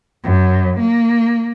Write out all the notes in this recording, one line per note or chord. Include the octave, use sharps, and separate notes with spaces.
F#2
A#3